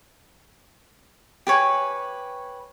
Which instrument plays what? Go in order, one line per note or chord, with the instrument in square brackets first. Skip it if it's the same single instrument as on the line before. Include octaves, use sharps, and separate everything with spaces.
[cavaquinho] G4 B4 C#5 G#5